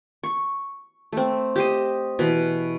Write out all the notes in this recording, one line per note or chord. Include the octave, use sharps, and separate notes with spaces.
C#6
A3 C4
G4 C5 D#5
B2 E3